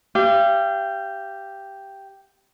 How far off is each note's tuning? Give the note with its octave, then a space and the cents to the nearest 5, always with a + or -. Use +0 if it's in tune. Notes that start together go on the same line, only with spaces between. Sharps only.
G4 +0 F5 -40